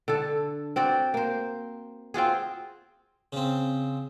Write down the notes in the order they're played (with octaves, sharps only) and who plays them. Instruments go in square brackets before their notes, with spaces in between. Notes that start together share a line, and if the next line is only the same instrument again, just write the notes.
[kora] D3 A4
C4 F#4 D5
A#3 C5
C4 F4 F#4 G#4
[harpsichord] C#3 C4